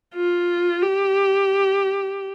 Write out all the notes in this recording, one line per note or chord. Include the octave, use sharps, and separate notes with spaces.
F4
G4